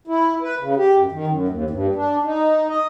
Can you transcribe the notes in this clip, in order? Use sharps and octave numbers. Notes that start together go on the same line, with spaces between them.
E4
B4
C#3
G4
F#2
D#3
F#2
D#2
G2
D4
D#4
D#5